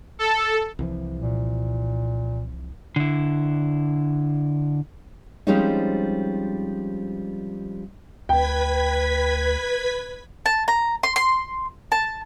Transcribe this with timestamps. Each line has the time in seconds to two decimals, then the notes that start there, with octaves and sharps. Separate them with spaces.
0.19 A4
0.79 C2 E3 F3
1.20 A#2
2.96 D3 E4
5.47 F3 G3 G#3 C4 C#4 D#4
8.29 D2 B4 G5 G#6 B6
10.46 A5
10.68 A#5
11.03 C6
11.16 C6
11.92 A5